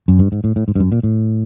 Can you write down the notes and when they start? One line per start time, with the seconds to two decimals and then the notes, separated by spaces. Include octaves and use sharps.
0.08 F#2
0.19 G2
0.32 G#2
0.44 A2
0.56 A2
0.68 G#2
0.75 G2
0.80 F#2
0.92 A#2
1.03 A2